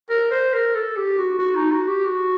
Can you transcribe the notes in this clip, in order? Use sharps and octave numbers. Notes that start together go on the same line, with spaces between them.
A#4
C5
A#4
A4
G4
F#4
F#4
D#4
F#4
G4
F#4